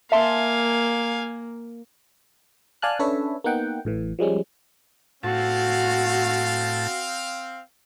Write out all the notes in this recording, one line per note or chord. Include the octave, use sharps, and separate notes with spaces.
A#3 E5 F5 G#5 A5 C6
D5 F5 G#5 A5 F6 F#6
C#4 D4 A4 B4 C#5 E5
A#3 B3 D#4 F#5 G5
A1 A2 E3
F3 G3 G#3 C#4
A2 C4 F#4 F5 A5